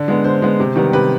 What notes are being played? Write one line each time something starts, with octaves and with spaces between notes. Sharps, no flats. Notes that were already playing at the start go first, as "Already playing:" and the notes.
Already playing: D3
G#3 B3
D3 C5
G#3 B3
C3
D#3 G3 B3
C3 B4